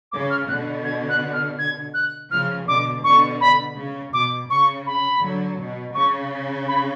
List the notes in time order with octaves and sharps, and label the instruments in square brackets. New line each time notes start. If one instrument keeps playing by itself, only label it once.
[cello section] C#3 [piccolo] D6
[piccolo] F6
[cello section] B2 D3 [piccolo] F#6
[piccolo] G#6
F#6
F6
G#6
F#6
[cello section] C#3 F3 [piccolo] F6
[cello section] B2 D3 [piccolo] D6
[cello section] B2 D3 [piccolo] C#6
[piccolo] B5
[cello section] C#3
[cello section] B2 [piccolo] D6
[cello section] C#3 [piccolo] C#6
[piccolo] B5
[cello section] D3 F#3
B2
[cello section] C#3 [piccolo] C#6
[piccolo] B5